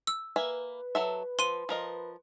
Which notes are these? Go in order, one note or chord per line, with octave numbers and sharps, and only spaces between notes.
E6
A#3 B4 E5 G#5
F#3 A4 E5
F3 C6 D#7
F3 A#4 D#5